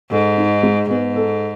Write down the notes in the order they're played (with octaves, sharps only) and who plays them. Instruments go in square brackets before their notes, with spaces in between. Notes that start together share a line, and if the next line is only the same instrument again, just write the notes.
[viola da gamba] G#2 [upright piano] A4
[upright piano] D#4
G#3
[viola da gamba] G#2 [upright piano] B3
[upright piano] A4